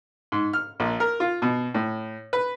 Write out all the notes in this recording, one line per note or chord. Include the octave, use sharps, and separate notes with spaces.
G#2
F6
A#1
A#4
F4
B2
A2
B4